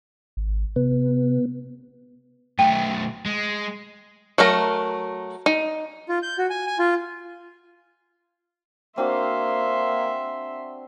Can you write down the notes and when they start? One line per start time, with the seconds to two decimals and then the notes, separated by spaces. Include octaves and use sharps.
0.37 G#1
0.76 C3 B3
2.59 B1 A3 G5
3.26 G#3
4.38 F#3 A3 A#4 A#5
5.46 D#4
6.09 F4
6.23 G6
6.38 F#4
6.50 G#5
6.67 G#5
6.79 F4
8.98 A#3 C4 D4 F#4 E5 C6